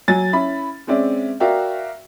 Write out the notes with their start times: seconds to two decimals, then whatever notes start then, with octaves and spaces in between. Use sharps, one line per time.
0.08 F#3 G#5 A6
0.33 C#4 E4 B5
0.87 G#3 C4 C#4 D5 E5
1.40 F#4 A#4 D5 E5 F5 G5